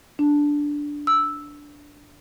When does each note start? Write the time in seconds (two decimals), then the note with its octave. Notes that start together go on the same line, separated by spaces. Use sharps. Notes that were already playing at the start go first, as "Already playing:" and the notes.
0.19 D4
1.07 E6